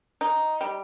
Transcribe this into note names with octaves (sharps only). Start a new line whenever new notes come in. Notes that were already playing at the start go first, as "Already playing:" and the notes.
D#4
G3